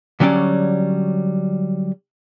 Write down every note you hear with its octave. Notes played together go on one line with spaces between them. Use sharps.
D3 F#3 G3 C#4 D5